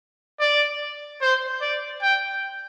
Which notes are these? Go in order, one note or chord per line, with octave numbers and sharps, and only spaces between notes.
D5
C5
D5
G5